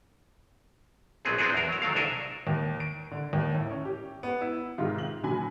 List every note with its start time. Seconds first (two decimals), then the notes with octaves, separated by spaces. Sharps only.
1.25 A#1 F#3 B3 C4 G#4
1.38 B3 C4 D4 E4 F#4 G#4
1.54 E2 A#4
1.69 F#3 A#4
1.82 D#3 F#3 A3 F5
1.95 C2 D4 A4 A#4 G#5
2.47 D#2
2.80 D7
3.11 D3
3.33 D#2
3.54 A2
3.71 C#4
3.85 G4
4.23 B3
4.41 E4
4.78 G#2 C3 D#3 F4
4.98 F#7
5.23 A#2 D3 F#3 G#5 B5